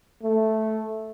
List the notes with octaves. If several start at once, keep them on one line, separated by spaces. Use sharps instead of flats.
A3